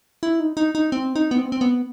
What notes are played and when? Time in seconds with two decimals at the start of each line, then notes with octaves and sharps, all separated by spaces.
0.23 E4
0.40 D#4
0.57 D#4
0.75 D#4
0.92 C4
1.16 D#4
1.31 B3
1.38 C4
1.52 C4
1.61 B3